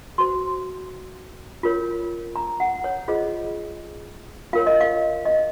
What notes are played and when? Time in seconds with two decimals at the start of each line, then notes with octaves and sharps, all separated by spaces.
0.18 F#4 C5 C6
1.63 F4 A#4 C#5
2.36 A#5
2.60 F#5
2.84 C#5
3.08 F4 G#4 C5 D#5
4.53 F4 A#4 C#5 F5
4.67 D#5
4.81 F5
5.25 D#5